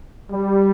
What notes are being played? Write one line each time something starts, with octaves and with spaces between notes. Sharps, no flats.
G3